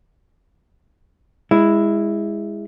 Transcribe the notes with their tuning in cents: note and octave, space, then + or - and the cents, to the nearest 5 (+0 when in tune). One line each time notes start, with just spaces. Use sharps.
G#3 -20 E4 +0